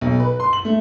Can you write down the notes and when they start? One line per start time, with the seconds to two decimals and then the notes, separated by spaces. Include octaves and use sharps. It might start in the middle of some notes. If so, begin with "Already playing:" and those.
0.01 B1
0.20 B4
0.40 C6
0.53 F#7
0.65 A3